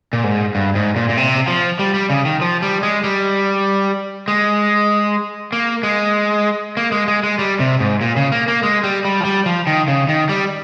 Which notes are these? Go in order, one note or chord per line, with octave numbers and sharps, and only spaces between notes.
A#2
G#2
G2
G#2
A#2
A#2
C3
F3
G3
G3
C#3
D#3
F3
G3
G#3
G3
G#3
A#3
G#3
A#3
G#3
G#3
G#3
G3
C3
G#2
A#2
C#3
A#3
A#3
G#3
G3
G3
F3
G3
F3
D#3
C#3
D#3
G3